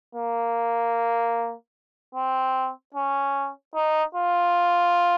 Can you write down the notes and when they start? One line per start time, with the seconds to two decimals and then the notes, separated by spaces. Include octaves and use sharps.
0.15 A#3
2.15 C4
2.94 C#4
3.75 D#4
4.15 F4